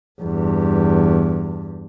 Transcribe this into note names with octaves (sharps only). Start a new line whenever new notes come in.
E2 G2